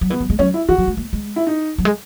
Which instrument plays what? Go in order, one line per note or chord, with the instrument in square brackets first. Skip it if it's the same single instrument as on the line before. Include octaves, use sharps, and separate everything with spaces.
[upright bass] F#3
[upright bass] E3 [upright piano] B3
[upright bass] F#3
G#3
[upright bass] F#3 [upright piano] C#4
[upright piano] E4
[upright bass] E3 [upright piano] F#4
[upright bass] F#3
G#3
A#3
G#3
[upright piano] E4
D#4
[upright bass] F#3
G#3